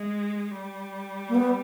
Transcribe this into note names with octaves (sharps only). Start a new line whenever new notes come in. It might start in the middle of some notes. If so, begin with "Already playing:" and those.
Already playing: G#3
G3
A#3
B3